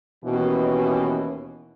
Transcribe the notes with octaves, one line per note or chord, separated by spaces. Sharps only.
D#2 B2 E3 C#4